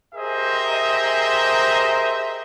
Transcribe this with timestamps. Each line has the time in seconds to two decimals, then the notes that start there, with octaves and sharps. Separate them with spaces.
0.15 G4 G#4 A#4 C5 D#5 E5